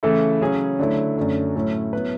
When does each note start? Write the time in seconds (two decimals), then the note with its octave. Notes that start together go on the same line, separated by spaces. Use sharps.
0.03 C#3 E3 A3 E4 A4
0.41 C#3 F#3 C#4 G#4
0.79 D3 F#3 A3 E4
1.16 F#2 D3 F#3 A3
1.55 A2 F#3 A3 C#4 E4
1.93 F#3 B3 E4 B4